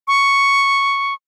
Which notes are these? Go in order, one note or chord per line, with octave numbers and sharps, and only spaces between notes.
C#6